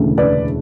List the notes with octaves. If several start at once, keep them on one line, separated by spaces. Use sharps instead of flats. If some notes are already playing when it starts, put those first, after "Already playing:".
Already playing: E1 D2 C#3 E3 A3
B4 D5